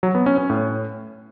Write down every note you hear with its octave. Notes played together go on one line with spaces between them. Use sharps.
F#3
B3
C#4
C#4
A2